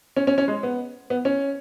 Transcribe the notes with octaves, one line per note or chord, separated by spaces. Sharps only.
C#4
C#4
C#4
G#3
B3
B3
C#4